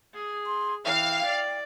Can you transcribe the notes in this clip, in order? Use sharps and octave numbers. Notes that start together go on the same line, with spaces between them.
G#4
C6
E3 F5 G5
D5